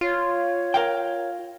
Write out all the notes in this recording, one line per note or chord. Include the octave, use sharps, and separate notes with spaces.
F4 C#5
A#4 F5 G5